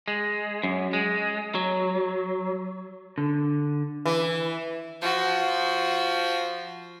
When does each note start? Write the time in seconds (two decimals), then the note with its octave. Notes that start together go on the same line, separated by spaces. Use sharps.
0.08 G#3
0.63 F#2
0.93 G#3
1.55 F#3
3.18 D3
4.06 E3
5.02 F3 F#4